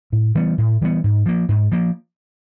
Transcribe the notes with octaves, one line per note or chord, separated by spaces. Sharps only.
A2
E3 G3 B3
A2
E3 G3 B3
G#2
F3 A#3
G#2
F3 A#3